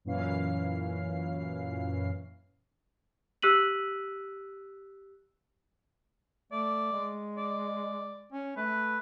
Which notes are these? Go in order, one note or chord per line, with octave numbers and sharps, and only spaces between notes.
F#2 A#2 E3 C#4 F5 C7
G4 E6 F#6 B6 D#7 F#7
A3 D5
G#3
D5
C#4
A3 B4